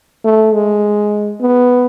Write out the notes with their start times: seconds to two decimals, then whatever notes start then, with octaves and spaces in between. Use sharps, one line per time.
0.24 A3
0.54 G#3
1.41 B3